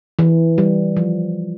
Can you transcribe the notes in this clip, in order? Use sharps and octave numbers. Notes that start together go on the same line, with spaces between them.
E3
G3
F3